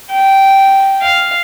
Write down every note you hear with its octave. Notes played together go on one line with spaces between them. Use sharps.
G5
F5